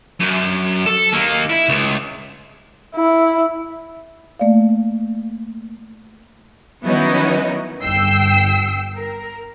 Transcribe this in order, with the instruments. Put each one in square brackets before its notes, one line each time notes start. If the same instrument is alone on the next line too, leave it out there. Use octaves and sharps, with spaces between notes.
[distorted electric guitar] F#2
A4
D#3 A#3
E4
C#2
[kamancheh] E4
[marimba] A3 A#3 D5 F5
[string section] D#3 F#3 B3 C#4 D#4 E4
G1 G5 E6 C7
A#4